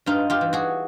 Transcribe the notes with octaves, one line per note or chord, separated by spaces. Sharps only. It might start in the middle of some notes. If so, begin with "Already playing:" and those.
G2 D#4 F4
F4 G4
E3
F#4 G#4